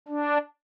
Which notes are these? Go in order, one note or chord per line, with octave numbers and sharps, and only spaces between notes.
D4